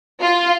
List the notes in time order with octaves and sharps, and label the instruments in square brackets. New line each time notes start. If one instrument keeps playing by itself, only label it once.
[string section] F4